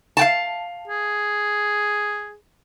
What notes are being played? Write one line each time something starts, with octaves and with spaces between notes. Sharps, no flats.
F5 G5 A5
G#4